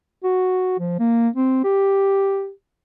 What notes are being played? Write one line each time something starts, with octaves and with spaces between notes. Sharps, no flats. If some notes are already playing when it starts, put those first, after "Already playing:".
F#4
F3
A#3
C4
G4